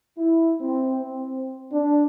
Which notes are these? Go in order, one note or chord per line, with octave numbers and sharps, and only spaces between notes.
E4
C4
C4
D4